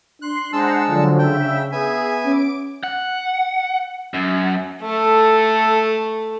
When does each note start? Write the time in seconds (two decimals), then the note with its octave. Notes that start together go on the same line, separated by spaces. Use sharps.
0.22 D4 C6 F#6
0.53 G#3 D4 C5 F#5 A5 A#5 E6
0.87 D3 F3 F#3
1.19 C#3 E5 G5
1.72 B3 G#4 E5 G#5
2.25 C#4 D6 D7
2.83 F#5
4.14 F#2
4.83 A3 A4